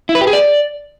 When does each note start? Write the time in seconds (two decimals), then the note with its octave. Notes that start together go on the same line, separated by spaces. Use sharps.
0.09 E4
0.15 B4
0.21 G4
0.27 G#4
0.33 D5